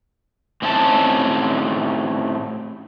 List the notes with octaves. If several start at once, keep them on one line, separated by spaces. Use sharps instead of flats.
A2 C4 C#4 D#4 A#4 A5